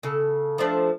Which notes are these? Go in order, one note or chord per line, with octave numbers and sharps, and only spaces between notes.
C#3 A4
F3 A3 D4